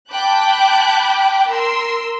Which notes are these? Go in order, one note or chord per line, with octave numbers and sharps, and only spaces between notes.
G5 A5 B5 D6 F#6 G6
A#4 C6 E6